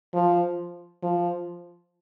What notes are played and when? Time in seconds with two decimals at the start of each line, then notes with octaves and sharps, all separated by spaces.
0.15 F3
1.03 F3